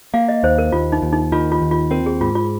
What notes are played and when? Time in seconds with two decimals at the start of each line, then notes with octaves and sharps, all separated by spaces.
0.14 A#3 F5
0.29 D#5
0.43 D#2 C5
0.58 A#4
0.72 D#2 F4
0.92 D#4
1.02 D#2
1.12 D#4
1.32 D#3 F4
1.52 F4
1.62 D#2
1.71 F4
1.91 C4 A#4
2.06 G#4
2.21 G#2 F4
2.35 F4